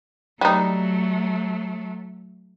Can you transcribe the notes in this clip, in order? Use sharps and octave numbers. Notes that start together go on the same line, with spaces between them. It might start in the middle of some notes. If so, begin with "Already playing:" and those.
F#3 G3 A3 D#4